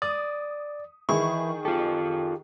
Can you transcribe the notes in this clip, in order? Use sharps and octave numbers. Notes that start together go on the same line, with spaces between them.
D5 D#6
D#3 E3 E4 G#4 C#6
F4 G4 A4